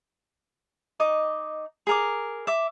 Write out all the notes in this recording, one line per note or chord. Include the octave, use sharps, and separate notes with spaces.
D#4 D#5 D6
G#4 A#4 D6
E5 D6